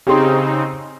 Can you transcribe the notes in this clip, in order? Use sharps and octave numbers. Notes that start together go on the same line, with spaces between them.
C#3 C4 D#4 G4 G#4 C6